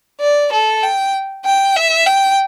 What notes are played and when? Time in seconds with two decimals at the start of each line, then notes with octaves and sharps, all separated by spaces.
0.21 D5
0.53 A4
0.83 G5
1.45 G5
1.76 E5
2.07 G5